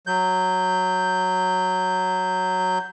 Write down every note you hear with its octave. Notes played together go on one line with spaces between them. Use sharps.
F#3 G6